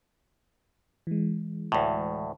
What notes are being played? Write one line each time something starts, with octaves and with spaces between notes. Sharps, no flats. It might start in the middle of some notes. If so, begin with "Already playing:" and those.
E3 G#3
D2 A2